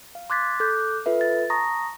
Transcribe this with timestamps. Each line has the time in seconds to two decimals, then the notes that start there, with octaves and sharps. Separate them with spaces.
0.15 F5
0.30 C6 D6 F#6 G#6 A6 B6
0.60 A4 D6 F#6 G6
1.06 F4 A4 B4 E5
1.21 A6
1.50 A5 A#5 C#6 D#6 A#6